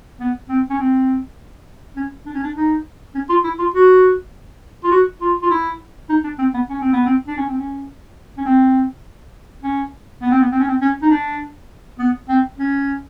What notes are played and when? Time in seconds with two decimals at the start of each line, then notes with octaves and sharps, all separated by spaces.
0.20 B3
0.49 C4
0.70 C#4
0.79 C4
1.96 C#4
2.26 D4
2.34 C#4
2.43 D4
2.56 D#4
3.15 C#4
3.29 F4
3.44 E4
3.59 F4
3.74 F#4
4.84 F4
4.92 F#4
5.21 F4
5.43 F4
5.51 E4
6.10 D#4
6.24 D4
6.39 C4
6.54 B3
6.69 C#4
6.81 C4
6.93 B3
7.06 C4
7.27 D4
7.37 C#4
7.48 C4
7.58 C#4
8.37 C#4
8.45 C4
9.63 C#4
10.22 B3
10.31 C4
10.40 B3
10.52 C4
10.60 C#4
10.67 C4
10.81 C#4
11.02 D#4
11.11 D4
11.99 B3
12.29 C4
12.58 C#4